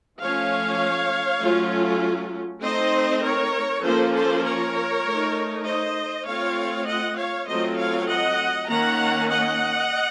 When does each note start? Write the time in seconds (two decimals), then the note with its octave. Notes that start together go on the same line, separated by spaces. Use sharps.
0.20 F3 A3 C#4 C#5 F5
1.41 F#3 A3 C#4 F4
2.62 A3 C4 D#4 C5 D#5
3.23 A#4 C#5
3.83 F3 A#3 C#4 F4 A4 C5
4.13 A4 C5
4.44 A#4 C#5
5.05 A3
5.10 D#4
5.65 C5 D#5
6.26 A3 C4 F4 C#5 F5
6.86 D#5 F#5
7.17 C#5 F5
7.47 F#3 A3 C4 F4 C5 D#5
7.77 C#5 F5
8.08 D#5 F#5
8.69 D#3 A#3 C#4 F#5 A#5
9.29 D#5 F#5